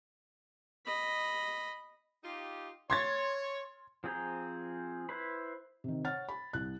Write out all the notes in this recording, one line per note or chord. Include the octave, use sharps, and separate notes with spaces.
D#5 B5
D#4 F4 G4
C#5 C6 G#6 A6
F3 C4 G#4 G5 A#5
E4 B4 C5 B5
C3 D#3
C#5 F#5 F6 A6
B5
C2 F#6